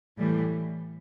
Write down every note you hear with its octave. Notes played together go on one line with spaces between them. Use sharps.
A2 E3 G3